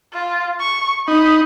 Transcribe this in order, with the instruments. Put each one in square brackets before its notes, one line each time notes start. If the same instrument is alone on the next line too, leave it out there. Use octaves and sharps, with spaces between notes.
[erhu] F4
C#6
[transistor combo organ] D#4 [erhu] B5